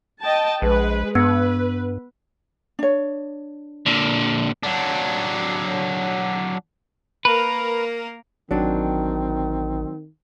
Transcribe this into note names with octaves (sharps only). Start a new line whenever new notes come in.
D#5 G5 A5
A#1 G#3 B4
G2 B3 B4
D4 C#5
A#2 D3
F#3 D4
A#3 A#4 B4
A1 D#3 F#3 C4 D4